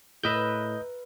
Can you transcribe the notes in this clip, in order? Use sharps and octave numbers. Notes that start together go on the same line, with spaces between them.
A2 A#4 B4 D#5 E5 G6